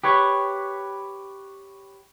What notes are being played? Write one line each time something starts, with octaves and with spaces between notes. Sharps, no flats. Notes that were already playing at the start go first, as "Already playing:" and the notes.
G4 B4 C#5